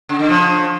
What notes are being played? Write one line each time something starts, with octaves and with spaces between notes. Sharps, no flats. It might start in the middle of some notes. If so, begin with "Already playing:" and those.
C#3
D3
C#3 F3